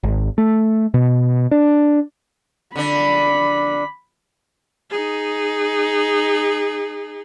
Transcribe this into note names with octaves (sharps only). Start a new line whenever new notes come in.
G#1
A3
B2
D4
D3 D4 B5
D#4 G#4